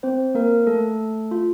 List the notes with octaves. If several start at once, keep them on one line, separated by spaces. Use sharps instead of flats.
C4 C5
A#3 A#4
A3 A4
F4